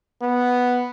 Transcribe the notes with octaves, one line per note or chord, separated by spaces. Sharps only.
B3